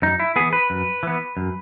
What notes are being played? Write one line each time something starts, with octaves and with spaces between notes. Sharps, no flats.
F#2 D#4
E4
E3 B3 G#4
B4
F#2
E3 B3
F#2